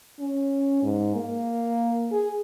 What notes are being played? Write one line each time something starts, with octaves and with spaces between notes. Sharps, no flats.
C#4
G#2
A#3
G#4